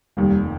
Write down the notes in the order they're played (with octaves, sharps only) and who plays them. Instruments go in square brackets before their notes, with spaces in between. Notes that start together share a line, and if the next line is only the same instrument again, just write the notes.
[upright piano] F1 D#2 D#3 [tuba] G3